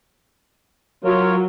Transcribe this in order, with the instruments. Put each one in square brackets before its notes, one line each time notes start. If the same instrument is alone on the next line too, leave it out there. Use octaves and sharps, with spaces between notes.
[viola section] F#3 [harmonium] F4 A#4 C#5